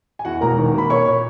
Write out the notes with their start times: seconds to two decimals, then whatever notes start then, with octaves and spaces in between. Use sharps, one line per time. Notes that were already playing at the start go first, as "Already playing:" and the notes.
0.19 G#5
0.25 E2 F#4 F#5
0.41 E1 A#4 A#5
0.57 D#3
0.74 A#3 B5
0.90 A#3 C#5 C#6
1.07 A#2